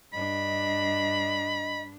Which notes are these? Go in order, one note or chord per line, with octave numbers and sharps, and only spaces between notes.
G2 D4 D#5 B5